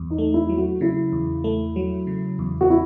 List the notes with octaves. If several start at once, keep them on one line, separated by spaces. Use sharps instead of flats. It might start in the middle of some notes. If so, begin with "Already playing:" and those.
Already playing: E2
D#4
A3
E4
F#3
F#4
C#3 E4
E2
A3
F#3
C#3
E2
F#4
E4